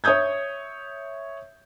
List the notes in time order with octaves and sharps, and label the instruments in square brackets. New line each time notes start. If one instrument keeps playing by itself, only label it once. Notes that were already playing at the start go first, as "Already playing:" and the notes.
[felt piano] C#5 E5 D#6 G6 G#6